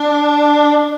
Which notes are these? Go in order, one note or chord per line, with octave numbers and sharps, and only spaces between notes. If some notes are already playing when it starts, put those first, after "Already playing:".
Already playing: D4